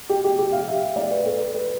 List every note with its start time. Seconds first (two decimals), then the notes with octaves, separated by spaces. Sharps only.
0.09 G4
0.24 G4
0.39 G4
0.52 F5
0.68 E5
0.96 D5
1.11 B4
1.26 A4
1.54 B4